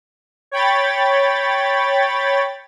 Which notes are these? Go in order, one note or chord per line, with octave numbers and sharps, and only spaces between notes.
C#5 G5 B5 A6